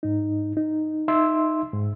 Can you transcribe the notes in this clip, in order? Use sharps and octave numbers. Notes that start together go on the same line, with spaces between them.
G#2 D#4
D#4
D#4 E5 C6 E6
G#2